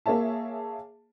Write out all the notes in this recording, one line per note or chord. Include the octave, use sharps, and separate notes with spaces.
A#3 G#4 C#5 E5 A5